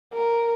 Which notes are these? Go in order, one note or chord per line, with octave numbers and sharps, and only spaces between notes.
A#4